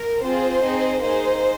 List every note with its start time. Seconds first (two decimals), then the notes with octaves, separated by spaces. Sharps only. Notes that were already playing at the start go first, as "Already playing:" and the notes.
Already playing: A#4
0.23 C4 F4 G#4 C5
0.64 C4 D#4 G#4
1.02 A#3 D#4 G#4 C5